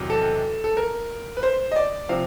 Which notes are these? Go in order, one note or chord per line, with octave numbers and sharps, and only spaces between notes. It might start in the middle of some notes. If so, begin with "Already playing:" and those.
Already playing: E2 C3 D#3 F#3
A4
A4
A#4
B4
C5
D#5
D5
C3 F3 F5